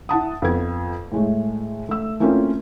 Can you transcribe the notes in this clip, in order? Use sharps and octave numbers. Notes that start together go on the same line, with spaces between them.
E4 F#5 A5 D#6
F2 B3 G#6
A2 G#3 A3
A3 E6
A3 A#3 C4 C#4 E4 F4